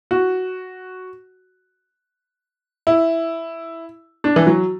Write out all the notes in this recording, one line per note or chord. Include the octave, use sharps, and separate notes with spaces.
F#4
E4
D4
E3
F#3